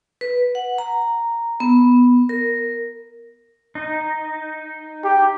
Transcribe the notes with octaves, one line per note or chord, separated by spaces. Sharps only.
B4
F#5
A#5
B3
A#4
D#4
G4